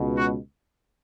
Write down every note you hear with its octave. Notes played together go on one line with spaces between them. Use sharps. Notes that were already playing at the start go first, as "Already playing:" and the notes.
Already playing: C#2 B2
F#4